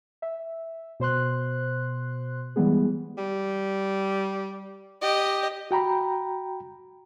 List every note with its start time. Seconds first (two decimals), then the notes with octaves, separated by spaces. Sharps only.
0.22 E5
1.00 B2 C5 C6 F#6
2.56 E3 G3 G#3 B3 G#4
3.17 G3
5.02 G4 D#5
5.71 F#4 G5 A#5 B5